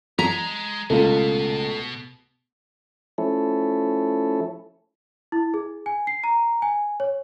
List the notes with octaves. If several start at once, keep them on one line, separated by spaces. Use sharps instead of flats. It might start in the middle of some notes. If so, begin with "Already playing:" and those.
G#3 A#5 B6
C#2 B2 A3 F4 A4
F3 A3 C#4 E4 A4
E4
G#4
G#5
C7
A#5
G#5
C#5